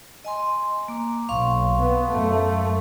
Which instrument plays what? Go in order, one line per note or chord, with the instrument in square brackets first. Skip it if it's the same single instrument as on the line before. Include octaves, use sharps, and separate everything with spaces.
[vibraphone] D#5 G#5 C6
A#3 D6
[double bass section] B1 [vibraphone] F5 C6 C#6
[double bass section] B3
F#2 A3